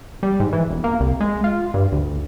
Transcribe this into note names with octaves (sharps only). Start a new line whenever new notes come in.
G3
G#2
E3
E1
A#3
C2
G#3
F4
G2
D2